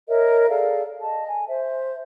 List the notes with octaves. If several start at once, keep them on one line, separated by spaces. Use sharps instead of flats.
A#4 C#5 D#5 E5
G#4 A4 D5 F5
D#5 A5
G#5
C5 E5